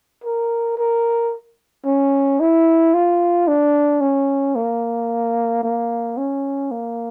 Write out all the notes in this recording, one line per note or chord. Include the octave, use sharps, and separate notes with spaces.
A#4
A#4
C#4
E4
F4
D4
C#4
A#3
A#3
C#4
A#3